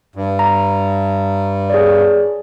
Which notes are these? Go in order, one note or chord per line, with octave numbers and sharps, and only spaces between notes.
G2
A#5
G#4 C#5 D5